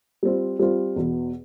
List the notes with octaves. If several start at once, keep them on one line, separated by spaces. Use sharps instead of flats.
G3 C4 F4
G3 C4 F4
E2 B2 B3